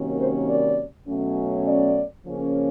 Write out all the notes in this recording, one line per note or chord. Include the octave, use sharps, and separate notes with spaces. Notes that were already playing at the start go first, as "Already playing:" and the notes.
Already playing: C3 D#3 F#3 A#3 C#4
C5
D5
B2 F#3 A3 C#4
D5
C#3 F3 A#3 C#4